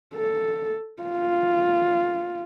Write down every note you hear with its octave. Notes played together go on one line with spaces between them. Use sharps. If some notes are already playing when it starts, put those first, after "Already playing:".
A4
F4